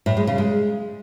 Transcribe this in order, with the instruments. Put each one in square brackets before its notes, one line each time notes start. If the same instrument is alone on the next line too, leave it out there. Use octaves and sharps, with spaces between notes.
[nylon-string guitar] A2
G#3
C#3
G#3